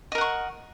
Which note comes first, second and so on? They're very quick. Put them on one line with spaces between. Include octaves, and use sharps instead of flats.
D#5 A#4 F#5 C#6